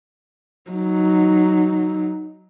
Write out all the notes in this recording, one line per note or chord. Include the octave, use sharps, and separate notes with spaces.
F#3 D#4